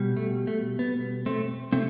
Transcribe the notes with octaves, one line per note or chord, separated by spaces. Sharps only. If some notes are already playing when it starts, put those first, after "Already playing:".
Already playing: B2 G3
A3
A3
B3
A3 C4
C3 A3 C4